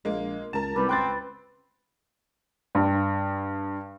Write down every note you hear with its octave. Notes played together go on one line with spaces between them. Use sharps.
A#1 G#3 A#3
C#2 A#4 A5
C2 G3 B4
C#2 C4 G5 F#6 A6
G2